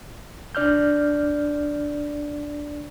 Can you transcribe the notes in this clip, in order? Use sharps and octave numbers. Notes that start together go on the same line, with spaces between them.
C2 D4 D5 F6 G6